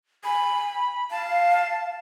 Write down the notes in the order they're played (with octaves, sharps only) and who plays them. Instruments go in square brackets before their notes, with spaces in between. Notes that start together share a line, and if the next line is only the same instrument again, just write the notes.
[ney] G#5 [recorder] B5
[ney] F5 [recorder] A5